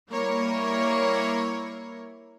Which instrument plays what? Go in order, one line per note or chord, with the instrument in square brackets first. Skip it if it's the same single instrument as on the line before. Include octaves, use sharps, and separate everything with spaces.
[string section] G3 A#3 E4 A#4 C#5